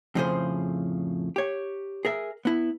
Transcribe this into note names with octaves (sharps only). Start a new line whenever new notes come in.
F2 A2 C#3 F3 G#4 C5
G4 C#5
G#4 A#4 E5
B3 E4